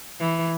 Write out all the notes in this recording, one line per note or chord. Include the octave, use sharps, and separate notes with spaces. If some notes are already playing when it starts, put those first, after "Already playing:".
E3